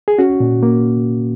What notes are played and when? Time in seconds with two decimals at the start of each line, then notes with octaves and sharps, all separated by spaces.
0.08 G#4
0.19 C#4 F#4
0.40 A#2
0.63 A#3